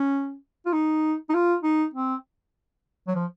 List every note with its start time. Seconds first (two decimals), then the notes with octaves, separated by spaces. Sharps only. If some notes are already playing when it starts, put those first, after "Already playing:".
Already playing: C#4
0.66 F4
0.73 D#4
1.29 D#4
1.34 F4
1.63 D#4
1.94 C4
3.07 F#3
3.15 F3